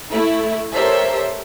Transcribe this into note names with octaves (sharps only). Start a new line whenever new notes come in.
A3 E4
G4 A4 A#4 C5 C#5 E5